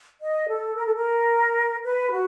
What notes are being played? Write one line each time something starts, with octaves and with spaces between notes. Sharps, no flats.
D#5
A4
A#4
A4
A#4
B4
F#4